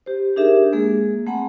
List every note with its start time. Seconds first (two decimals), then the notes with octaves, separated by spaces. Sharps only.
0.06 G4 C5
0.36 D4 D#4 G4 G#4 A#4 E5
0.73 G#3 A#3 G#4
1.27 A3 C4 F#5 G#5 A#5 B5